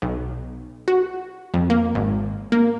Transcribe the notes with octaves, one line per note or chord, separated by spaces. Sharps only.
B1
F#4
F2
A#3
G#1
A#3